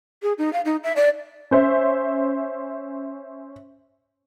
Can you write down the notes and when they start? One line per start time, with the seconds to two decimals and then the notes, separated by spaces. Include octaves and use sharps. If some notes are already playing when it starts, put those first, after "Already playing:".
0.23 G#4
0.38 D#4
0.53 F5
0.65 D#4
0.83 E5
0.96 D5
1.51 C#4 C5 E5